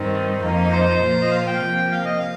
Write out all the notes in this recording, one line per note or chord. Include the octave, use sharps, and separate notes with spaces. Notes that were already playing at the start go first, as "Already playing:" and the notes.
Already playing: G2 D#3 G3 C4 D#4
F2 F3 A#3 D#4
C5
A#2 F3 A#3 F4
D#5
F5
G5
C3 F3 A#3
F5
D#5
F5